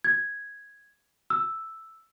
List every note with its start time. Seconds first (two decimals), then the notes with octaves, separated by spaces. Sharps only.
0.04 G#6
1.30 E6